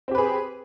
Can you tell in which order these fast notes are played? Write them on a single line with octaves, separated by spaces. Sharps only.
C4 G4 B4 G#4